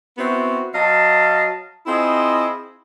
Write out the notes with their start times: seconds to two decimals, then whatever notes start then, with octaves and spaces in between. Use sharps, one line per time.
0.18 B3 C4 E4 F#4
0.74 F#3 D#5 F5 A5
1.86 C4 E4 F4 G#4 D#5